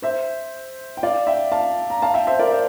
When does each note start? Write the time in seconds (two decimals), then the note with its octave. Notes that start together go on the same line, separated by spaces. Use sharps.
0.02 C5 E5
0.97 G5
1.03 D5 F5
1.27 E5 G5
1.52 F5 A5
1.90 A#5
2.02 F5 A5
2.14 E5 G5
2.27 C5 E5
2.39 A#4 D5
2.52 C5 E5